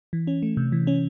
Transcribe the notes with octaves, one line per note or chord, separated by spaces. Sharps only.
E3
C#4
A3
C3
E3
C#4